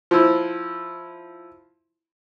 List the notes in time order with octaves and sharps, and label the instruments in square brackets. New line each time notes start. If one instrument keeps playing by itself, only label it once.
[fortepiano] F3 E4